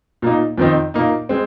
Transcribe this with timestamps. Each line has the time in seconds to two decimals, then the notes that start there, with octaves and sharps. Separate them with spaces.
0.22 A#2 A#3 D#4
0.58 F2 D#3 C4 D#4
0.94 A#2 A#3 D#4
1.29 G#3 C4